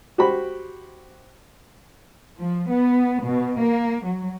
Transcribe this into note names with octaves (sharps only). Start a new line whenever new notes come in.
F#4 G4 C5 B5
F3
B3
B2
A#3
F#3